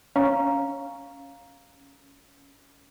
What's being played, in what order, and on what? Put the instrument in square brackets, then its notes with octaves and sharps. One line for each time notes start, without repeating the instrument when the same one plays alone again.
[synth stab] C#4 [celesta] F5 A#5